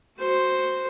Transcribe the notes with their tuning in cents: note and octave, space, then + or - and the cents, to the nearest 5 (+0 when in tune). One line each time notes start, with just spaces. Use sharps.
F#4 +0 C5 +0